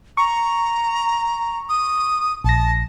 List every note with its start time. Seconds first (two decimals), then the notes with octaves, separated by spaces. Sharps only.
0.17 A#5 C#6
1.69 D#6
2.44 A#1 A5 A#6